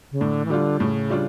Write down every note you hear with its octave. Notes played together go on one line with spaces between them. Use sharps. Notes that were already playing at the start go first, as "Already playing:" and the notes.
C#3
A2 D3
E3
D3 G3 D4 F4
A2 C#3
G3 D4 F4